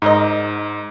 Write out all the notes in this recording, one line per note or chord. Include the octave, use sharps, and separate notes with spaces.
G#2 D#4 A#4 D#5